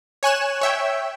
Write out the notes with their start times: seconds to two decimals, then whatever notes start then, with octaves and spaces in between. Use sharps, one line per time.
0.23 C#5 G#5 F#6 E7
0.61 C#5 E5 G5